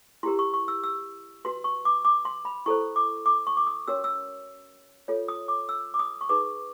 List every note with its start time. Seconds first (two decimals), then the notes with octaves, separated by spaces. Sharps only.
0.23 E4 G4 A#4 C6
0.39 C#6
0.54 C#6
0.68 E6
0.84 E6
1.45 F#4 B4 C6
1.64 C#6
1.85 D6
2.05 D6
2.25 C6
2.45 B5
2.66 E4 A4 C5 C#6
2.96 D6
3.26 D6
3.47 C#6
3.57 D6
3.67 D#6
3.87 C#4 F#4 A#4 C#5 E6
4.04 E6
5.08 F4 A4 C#5
5.28 D#6
5.48 D6
5.69 E6
5.94 D6
5.99 D#6
6.21 C#6
6.29 D#4 G#4 B4 D6